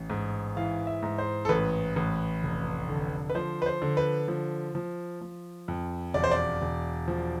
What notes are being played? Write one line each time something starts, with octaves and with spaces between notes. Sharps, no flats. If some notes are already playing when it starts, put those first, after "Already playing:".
Already playing: A1
G#2
E3 F5
E5
G#2
C5
A4
A1 B4
A1
F1
D3
B4
F3 C5
B4
C5
D3
B4
F3
F3
F3
F2
E1 D5
C5
D5
E1
F3